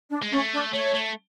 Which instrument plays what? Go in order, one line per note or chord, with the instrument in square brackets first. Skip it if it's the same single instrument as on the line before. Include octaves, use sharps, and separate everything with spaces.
[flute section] D4
[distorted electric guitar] G#3
[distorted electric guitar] A3 [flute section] C#4
[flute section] D4
[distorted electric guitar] A3 [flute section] C#5
[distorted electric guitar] A3